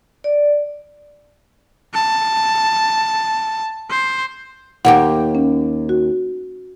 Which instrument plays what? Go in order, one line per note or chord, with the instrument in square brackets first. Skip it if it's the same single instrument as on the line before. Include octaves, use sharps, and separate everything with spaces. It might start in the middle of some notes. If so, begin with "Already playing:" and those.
[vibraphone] D5
[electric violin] A5
C5
[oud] D#2 A#3 G4 [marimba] F#5
[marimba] C#4
F#4